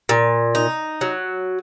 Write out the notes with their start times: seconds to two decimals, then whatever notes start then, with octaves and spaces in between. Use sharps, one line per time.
0.09 A#2
0.55 D#4
1.01 F#3